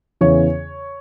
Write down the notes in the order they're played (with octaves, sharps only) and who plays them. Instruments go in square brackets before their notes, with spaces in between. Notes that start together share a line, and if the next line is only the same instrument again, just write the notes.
[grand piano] E2 C#3 E3 C#5